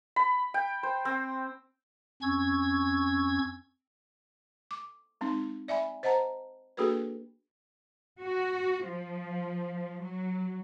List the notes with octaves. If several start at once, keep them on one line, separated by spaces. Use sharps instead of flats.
B5
G5
C5
C4
F2 C#4 C#6 E6 G#6
D6
G#3 C4 D#4
D5 E5 G#5 B5
C5 D#5 F#5 A5 A#5
A#3 D4 F#4 G#4 A4 B4
F#4
F3
F#3